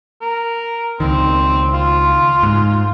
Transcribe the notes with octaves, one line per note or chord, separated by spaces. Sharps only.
A#4
C#2 D#3 C4
F4
G#2